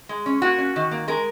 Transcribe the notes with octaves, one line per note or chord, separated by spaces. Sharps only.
G#3
C#4
A#3 F#4
C#4
D#3
A#3
G#3 A#4